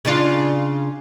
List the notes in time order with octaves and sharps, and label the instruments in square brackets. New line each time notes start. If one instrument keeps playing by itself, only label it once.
[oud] C#3 D4 F4